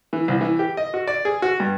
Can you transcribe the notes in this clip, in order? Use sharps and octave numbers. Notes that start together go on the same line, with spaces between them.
E3
C2
E3
G4
D#5
F#4
D5
G#4
F#4
G2